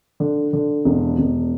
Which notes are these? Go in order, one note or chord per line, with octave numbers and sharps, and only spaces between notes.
D3
D3
E1
E1